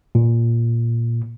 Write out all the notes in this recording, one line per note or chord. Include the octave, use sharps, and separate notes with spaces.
A#2